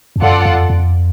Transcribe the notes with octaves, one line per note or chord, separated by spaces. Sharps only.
F2
F#2 F4 A4 D5 F#5
F2
F2